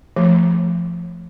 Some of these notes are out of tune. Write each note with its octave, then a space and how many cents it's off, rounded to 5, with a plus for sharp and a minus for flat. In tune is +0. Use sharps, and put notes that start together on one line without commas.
F3 -20 A3 +0